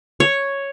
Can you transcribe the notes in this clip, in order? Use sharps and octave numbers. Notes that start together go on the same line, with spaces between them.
C#5